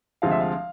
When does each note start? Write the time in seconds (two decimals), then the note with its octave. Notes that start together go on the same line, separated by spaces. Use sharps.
0.22 D2 C3 F3 G#3 F5
0.31 E5
0.40 F5